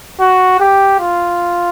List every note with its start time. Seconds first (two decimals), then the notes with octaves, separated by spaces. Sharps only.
0.20 F#4
0.60 G4
0.99 F4